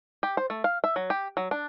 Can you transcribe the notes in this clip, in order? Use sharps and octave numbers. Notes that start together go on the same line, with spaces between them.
G4
C5
A3
F5
E5
F#3
G4
F#3
D4